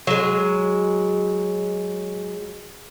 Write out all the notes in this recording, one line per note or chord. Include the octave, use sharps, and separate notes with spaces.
F#3 G#3